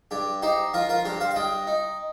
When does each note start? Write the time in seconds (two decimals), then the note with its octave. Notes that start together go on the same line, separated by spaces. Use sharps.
0.11 G2 G4
0.42 D#4 G4 C5
0.74 F3 F4 A#4
0.89 F4 A#4
1.05 G2 G4 C5
1.20 C5 F5
1.31 F5
1.36 G2 D#5 G5
1.67 D#4